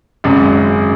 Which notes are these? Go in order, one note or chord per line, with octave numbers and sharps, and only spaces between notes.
G#1 F#2 C#3 G#3